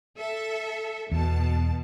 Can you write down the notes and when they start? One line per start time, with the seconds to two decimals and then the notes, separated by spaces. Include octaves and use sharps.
0.17 A4 E5
1.12 E2 B2 A5